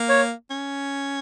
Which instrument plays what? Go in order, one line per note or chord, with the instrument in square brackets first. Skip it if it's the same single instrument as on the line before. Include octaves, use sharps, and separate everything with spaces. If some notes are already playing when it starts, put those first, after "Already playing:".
Already playing: [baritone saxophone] A#3
[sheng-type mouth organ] C#5
[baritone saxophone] C#4